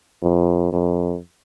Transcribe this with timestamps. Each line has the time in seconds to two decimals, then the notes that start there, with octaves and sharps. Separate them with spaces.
0.23 F2
0.72 F2